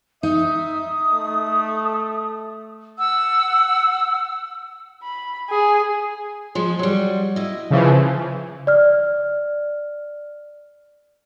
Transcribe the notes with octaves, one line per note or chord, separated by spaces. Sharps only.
D#4 E5 D#6
A3
F#5 E6
B5
G#4
F3 G#3
F#3 G3
E4 D#5
C#3 E3 F3
D5 F6